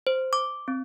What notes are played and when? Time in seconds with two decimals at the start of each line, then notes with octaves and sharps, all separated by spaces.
0.07 C5
0.33 D6
0.68 C4